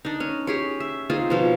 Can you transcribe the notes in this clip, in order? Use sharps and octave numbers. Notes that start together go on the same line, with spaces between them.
D4 D#4
C#4
G4 G#4 C#5
E5
C4 D#4 F4 G#4
B2 F3 C#5